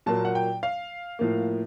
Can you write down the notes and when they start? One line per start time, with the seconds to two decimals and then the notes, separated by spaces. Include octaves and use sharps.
0.06 A#2 F#3 A#3 A5
0.25 F#5
0.35 G5
0.63 F5
1.19 A2 F3 A#3